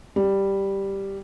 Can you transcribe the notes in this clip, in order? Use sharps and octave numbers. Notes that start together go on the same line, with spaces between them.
G3